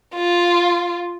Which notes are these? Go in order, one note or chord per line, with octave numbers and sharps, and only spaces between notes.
F4